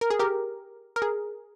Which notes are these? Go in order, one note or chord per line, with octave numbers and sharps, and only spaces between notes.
A#4
G#4
G4 A#4
A#4
G#4